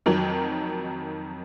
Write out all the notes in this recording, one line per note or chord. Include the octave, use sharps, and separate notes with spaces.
F2 D#3 F#3